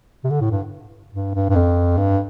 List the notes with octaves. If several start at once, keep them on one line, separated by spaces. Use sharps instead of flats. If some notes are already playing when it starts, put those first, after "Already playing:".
C3
D3
A2
G2
G2
G2
G2
F2
G2